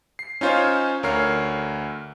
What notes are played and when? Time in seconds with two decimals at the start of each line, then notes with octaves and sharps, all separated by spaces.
0.19 C7
0.41 C#4 D#4 F4 C5 C#5
1.03 D2 A#4 C#5 F6 C7